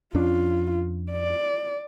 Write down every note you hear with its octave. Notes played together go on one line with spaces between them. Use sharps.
F2 C#4 D4 F4
D5